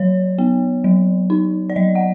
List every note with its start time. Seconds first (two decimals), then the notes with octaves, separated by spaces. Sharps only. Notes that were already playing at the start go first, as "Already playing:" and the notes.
Already playing: F#3 C#5
0.39 B3
0.84 F#3
1.30 D#4
1.70 D5
1.76 F#3 D#5
1.95 F#5